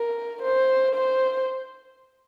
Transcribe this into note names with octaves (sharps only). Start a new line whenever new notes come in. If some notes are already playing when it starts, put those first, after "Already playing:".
Already playing: A#4
C5
C5